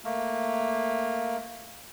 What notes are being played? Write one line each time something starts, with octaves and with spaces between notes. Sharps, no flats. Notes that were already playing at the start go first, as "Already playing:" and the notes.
A3 A#3